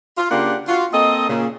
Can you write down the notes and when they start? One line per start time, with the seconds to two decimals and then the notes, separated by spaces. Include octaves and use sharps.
0.18 F4
0.31 C#3 A#3 D4 F4 G4 F#5
0.68 F4 F#4
0.93 A#3 C4 A4 D#5
1.29 A#2 C#3